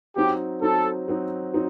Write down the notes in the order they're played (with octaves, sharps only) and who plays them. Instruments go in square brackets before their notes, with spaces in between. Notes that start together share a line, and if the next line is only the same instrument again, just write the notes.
[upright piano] F#3 C4 D#4 [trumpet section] G4
[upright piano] F#3 C4 D#4 [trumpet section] A4
[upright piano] F#3 C4 D#4
F#3 C4 D#4